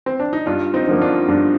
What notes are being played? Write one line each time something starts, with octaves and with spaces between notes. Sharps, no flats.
C4
D4
D#4
G2 D4 F4
C4 D#4
D3 F3 A#3
D4 F4
G2 D4 F4